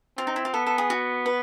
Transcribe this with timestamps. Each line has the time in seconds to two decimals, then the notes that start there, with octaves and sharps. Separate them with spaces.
0.18 C4 F4
0.27 D#4
0.36 E4
0.45 F4
0.54 B3 A4
0.67 A4
0.78 G#4
0.90 F#4
1.26 B4